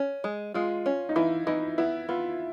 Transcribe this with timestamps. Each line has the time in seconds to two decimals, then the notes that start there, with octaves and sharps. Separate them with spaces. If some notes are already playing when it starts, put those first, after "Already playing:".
Already playing: C#4
0.24 G#3
0.54 G#3 F4
0.86 C#4
1.09 D#4
1.16 E3 E4
1.47 E3 D#4
1.78 B3 E4
2.09 B3 F4